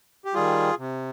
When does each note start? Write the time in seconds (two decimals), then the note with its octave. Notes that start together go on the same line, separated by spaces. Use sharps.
0.25 G4
0.34 D#3 G3 F4 G#4
0.79 C3